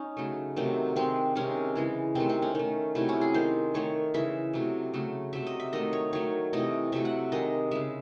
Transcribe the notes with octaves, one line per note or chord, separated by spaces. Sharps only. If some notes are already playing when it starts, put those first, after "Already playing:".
Already playing: C#4 D#4
C#3 F#3 A3
C3 D#3 F#3 A3
D#3 G#3 C4
C3 D#3 G#3 C#4
C#3 E3 G#3
C3 D#3 A3 C4
C4
C#4
D#3 A3
C3 F#3 A3 E4
C#4
G#4
D#3 G#3 C5
D#3 A3 C#5
C#3 E3 G#3 E5
C3 F#3 A3
C#3 F#3 A3
C3 F#3 A3 E5
D#5
E5
D#3 A3 D#5
C#5
D#3 F#3 A3 C#5
C3 E3 A3 D#5
C3 F#3 A3 E5
F#5
D#3 G#3 D#5
C#3 G#3 E5